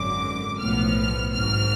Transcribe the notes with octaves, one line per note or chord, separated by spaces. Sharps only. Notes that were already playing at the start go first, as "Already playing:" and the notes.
Already playing: G#1 F#2 D3 D6
B1 A2 F3 B3 F6
G#1 G#2 F#3 F6